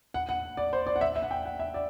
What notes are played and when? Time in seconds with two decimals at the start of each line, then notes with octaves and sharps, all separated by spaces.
0.14 F#5
0.29 F#5
0.57 D5
0.73 C5
0.87 D5
0.96 F#5
1.01 E5
1.16 E5
1.22 F#5
1.31 G5
1.45 F#5
1.59 E5
1.74 D5